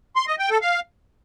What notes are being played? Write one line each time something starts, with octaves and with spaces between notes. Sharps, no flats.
C6
D#5
G5
A4
F5